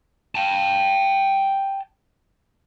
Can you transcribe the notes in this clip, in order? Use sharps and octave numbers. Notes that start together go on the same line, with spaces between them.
G5 A5